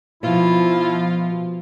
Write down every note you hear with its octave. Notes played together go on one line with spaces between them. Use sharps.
B2 F3 E4 F4